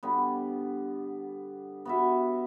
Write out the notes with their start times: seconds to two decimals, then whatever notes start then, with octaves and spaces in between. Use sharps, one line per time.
0.03 D3 G3 B3
1.85 B3 F#4 E5